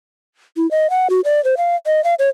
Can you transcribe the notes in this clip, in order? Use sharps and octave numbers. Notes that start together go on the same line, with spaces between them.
E4
D#5
F#5
F#4
D5
C5
F5
D#5
F5
C#5